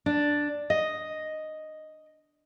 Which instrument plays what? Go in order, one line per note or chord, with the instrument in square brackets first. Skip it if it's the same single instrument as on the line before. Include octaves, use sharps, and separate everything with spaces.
[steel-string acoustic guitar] D4
D#5